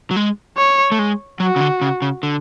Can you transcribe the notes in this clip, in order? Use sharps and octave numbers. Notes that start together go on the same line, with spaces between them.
F#3
G#3
C#5
A3
G#3
F#3 F#4
C#3
D3
C#3
C#3
D3